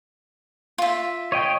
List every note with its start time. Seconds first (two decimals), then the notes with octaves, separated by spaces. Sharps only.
0.78 F4 E5
1.32 C#5 D#5 G5